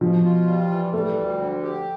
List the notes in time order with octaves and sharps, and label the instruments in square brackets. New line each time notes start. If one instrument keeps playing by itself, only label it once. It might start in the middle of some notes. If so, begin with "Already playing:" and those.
[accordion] B2 [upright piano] F3
[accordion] F4
G3
E3
[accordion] G3 [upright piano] A3
[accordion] D2
D3
G4